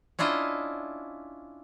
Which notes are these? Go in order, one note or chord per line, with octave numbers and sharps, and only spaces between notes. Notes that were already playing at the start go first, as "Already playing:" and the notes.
C#4 D4 E4 F4 D#5